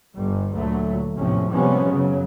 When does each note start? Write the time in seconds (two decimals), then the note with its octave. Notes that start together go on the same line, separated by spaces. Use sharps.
0.14 G1 G3
0.54 D2 A#2 F#3 A3
1.16 A1 E2 A2 C3 F3 C#4
1.50 C3 F3 G3 G#3 B3 C#4
1.89 F#2 C#3 F#3